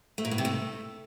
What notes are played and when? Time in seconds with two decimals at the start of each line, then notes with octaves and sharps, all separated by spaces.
0.18 A3
0.25 A#2
0.31 A2
0.38 C3
0.45 A3